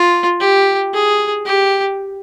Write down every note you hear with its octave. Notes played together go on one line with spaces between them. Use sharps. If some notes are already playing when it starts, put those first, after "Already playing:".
Already playing: F4
G4
G#4
G4